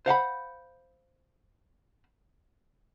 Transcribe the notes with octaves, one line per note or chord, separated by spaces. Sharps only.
C5 F5 F#5 B5